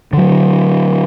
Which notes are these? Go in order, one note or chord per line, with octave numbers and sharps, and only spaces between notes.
D3 F#3